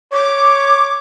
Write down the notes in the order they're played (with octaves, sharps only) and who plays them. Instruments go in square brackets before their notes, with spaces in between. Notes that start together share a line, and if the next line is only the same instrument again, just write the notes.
[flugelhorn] C#5 [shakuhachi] D6